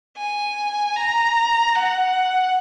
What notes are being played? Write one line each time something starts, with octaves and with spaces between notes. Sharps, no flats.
G#5
A#5
F#5